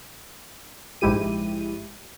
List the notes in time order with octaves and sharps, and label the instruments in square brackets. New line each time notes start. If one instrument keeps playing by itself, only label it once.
[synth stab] A#1 G#2 G#3 E4 G4 D#7